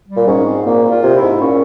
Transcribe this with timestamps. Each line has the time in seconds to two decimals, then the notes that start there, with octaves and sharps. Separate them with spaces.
0.08 G3
0.17 A#2
0.27 G#2 C#4
0.46 C4
0.66 A#2 A#3
0.85 A#2
0.91 F4
1.03 C3
1.16 E4
1.22 G#2
1.41 A#2 C#4